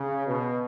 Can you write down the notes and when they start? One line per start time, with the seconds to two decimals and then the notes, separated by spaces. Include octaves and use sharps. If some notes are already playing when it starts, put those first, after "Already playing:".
Already playing: C#3
0.27 B2